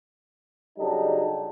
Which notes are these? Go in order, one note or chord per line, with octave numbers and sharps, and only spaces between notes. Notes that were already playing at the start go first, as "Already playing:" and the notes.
C#3 F#3 G3 D4 D#4 A4